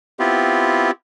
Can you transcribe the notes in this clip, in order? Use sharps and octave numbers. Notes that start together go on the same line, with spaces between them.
B3 C4 E4 F4 G4